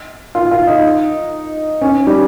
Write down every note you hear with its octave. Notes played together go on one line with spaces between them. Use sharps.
F4
F4
D#4
C#4
G3